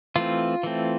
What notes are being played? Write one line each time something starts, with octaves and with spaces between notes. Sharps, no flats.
E3 A3 C4 F4
E3 A3 C4